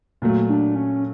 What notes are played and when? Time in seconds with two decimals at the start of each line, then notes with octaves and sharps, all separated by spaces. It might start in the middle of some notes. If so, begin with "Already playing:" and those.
0.22 A#2 F#3 A3
0.49 D4
0.75 C#4